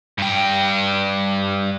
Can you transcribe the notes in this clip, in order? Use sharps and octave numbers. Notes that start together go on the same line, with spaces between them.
G2 G5